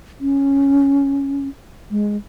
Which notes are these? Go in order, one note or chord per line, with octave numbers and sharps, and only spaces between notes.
C#4
G#3